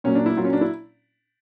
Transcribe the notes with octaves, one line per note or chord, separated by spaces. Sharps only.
A#2 F#3 A#3 C#4
D4
E4
A#2 F#3 A#3 F4
C#4
D4
E4